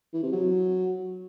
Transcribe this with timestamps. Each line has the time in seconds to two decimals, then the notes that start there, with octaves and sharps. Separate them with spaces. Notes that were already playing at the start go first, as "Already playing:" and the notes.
0.13 E3
0.23 C3
0.32 F#3